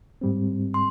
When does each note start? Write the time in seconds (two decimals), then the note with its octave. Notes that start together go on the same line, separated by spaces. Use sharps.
0.21 G#2 G3 C4
0.74 C6